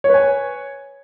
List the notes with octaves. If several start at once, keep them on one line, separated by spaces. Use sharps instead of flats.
B4 C#5 G#5